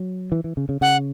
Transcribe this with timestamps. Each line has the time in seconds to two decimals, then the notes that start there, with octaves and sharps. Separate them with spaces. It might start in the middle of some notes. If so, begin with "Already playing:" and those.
Already playing: F#3
0.32 E3
0.44 E3
0.57 C#3
0.69 C#3
0.81 C#3 F#5